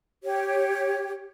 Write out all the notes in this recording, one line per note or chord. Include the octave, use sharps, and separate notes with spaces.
G4 C#5